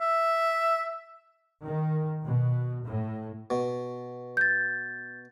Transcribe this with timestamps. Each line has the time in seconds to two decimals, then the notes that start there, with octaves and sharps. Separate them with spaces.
0.01 E5
1.65 D#3
2.24 B2
2.84 A2
3.50 B2
4.37 G6 A6